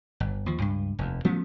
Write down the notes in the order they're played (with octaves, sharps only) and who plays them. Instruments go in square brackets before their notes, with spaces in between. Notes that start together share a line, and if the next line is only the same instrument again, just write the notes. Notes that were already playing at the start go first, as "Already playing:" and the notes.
[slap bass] G1
D#2 F3
C#2 G2
F1 D#2
F3 A3 B3 C#4